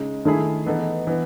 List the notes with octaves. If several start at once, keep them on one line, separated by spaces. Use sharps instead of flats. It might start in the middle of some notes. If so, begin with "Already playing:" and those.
Already playing: C#3 G#3 D#4
D#3 A3 E4 G#4
E3 B3 D#4 A4
E3 B3